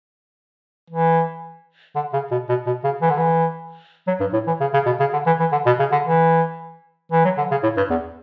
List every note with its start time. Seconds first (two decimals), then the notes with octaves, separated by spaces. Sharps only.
0.90 E3
1.95 D3
2.13 C#3
2.31 B2
2.49 B2
2.66 B2
2.84 C#3
3.02 E3
3.10 D3
3.18 E3
4.07 F#3
4.20 G2
4.33 A2
4.47 E3
4.60 C#3
4.73 C#3
4.86 B2
5.00 C#3
5.13 D3
5.26 E3
5.40 E3
5.52 D3
5.66 B2
5.79 C#3
5.92 D3
6.06 E3
7.12 E3
7.24 F#3
7.38 D3
7.51 C#3
7.63 A2
7.77 G2
7.90 E2